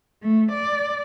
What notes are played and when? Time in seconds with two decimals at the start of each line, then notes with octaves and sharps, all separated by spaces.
0.22 A3
0.52 D5